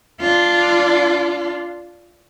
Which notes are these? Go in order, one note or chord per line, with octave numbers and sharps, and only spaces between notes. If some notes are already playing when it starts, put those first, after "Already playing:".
D4 F4